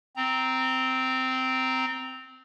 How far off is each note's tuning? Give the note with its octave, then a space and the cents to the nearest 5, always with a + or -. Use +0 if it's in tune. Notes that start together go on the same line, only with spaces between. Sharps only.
C4 -10 A#5 +0